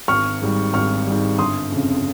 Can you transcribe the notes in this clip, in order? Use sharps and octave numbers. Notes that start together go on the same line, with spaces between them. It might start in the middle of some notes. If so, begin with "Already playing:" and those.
G#1 C#6 F6
G#2 G3
G#1 C#6 F6
G#2 G3
G1 C6 D#6
F2 C#3